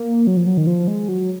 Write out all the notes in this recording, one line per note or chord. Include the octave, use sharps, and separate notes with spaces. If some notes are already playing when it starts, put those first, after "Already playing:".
Already playing: A#3
F#3
F3
F#3
D#3
F3
G#3
F#3